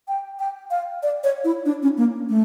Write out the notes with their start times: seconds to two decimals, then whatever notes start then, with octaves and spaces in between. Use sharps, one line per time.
0.08 G5
0.39 G5
0.71 F5
1.03 D5
1.24 C#5
1.44 E4
1.66 D4
1.82 C#4
1.98 A#3
2.29 A3